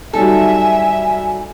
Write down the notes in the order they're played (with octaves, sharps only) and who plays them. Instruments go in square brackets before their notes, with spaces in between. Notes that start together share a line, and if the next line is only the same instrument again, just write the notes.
[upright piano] F#3 G3 D#4 [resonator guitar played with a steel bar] A4 [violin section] E5 [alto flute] G#5